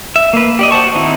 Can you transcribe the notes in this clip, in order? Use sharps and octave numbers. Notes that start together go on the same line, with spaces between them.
E5
A#3 B4
G4 D5 D#5
F#4 C5 A5 C#6
D#3 C4 D#4 E4 F#4